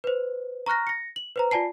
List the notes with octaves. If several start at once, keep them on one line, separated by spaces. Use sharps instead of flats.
B4 C5
A#5 C#6 F6 F#6 A#6
A#6 C#7
F#7
B4 C5 A#5
F4 D5 G#5 A5 C7